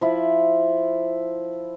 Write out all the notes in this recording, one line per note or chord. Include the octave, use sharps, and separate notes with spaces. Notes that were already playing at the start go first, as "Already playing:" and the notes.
F3 E4